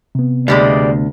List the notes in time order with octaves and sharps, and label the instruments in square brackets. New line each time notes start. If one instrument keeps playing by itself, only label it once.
[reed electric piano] C3 B3
[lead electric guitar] D2 [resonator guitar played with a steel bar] B2 G3 G#3 [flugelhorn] D5